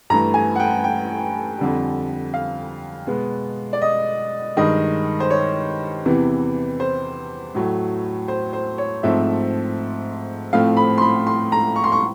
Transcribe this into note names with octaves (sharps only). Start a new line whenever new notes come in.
G2 E3 A3 A#5
G#5
F#5
G5
G5
F2 D3 G3
F5
B2 G#3 B3
D5
D#5
G2 D#3 G#3 D#5
C5
C#5
E2 C3 E3
C5
A2 F#3 A3
C5
C5
C#5
G#2 F3 A3 C4 E5
A2 F3 A3 C4 F5
B5
C6
B5
C6
A#5
C#6
C6
C#6